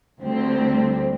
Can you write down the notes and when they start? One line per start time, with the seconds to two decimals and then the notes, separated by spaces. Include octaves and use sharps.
0.21 D2 D3 G3 C4